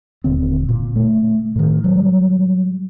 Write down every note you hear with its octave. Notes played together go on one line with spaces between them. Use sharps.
D#1 D3 C4
A#2
A3
A2 D#3
F#3 G3